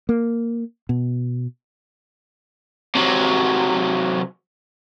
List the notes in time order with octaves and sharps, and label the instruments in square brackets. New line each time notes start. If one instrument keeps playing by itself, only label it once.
[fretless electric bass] A#3
B2
[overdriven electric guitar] C3 F#3